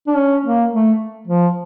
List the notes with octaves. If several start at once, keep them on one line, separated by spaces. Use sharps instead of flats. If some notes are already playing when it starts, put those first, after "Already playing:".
D4
C#4
A#3
A3
F3